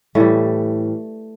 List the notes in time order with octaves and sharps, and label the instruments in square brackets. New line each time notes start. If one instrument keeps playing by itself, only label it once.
[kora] A2 E3 G3 A3